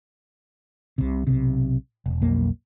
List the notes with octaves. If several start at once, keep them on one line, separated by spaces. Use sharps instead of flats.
C2 C3
B1 C3
E1
B1 F2 A#3